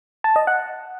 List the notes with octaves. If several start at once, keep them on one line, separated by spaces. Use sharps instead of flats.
A5
D#5
F#5